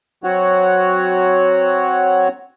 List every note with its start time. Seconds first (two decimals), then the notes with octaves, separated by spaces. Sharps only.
0.24 F#3 C4 F#4 C#5 F#5